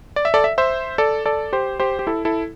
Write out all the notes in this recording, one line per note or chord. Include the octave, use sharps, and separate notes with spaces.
D5
E5
A4 D5
E5
C5 E5
A4 D5
A4 D5
G4 C5
G4 C5
G4
E4 A4
E4 A4